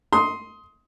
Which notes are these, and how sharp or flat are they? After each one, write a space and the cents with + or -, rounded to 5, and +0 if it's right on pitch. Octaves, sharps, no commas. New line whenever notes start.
C6 +0 D#6 +20